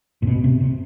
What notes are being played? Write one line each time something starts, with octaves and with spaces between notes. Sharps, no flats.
A#2
B2
C3
C3